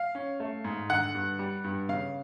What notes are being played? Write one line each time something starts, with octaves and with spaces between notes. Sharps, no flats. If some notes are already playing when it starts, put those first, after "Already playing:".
Already playing: F5
C#4
A3
G#2
D3 F#5
G2
G3
G2
C#3 F5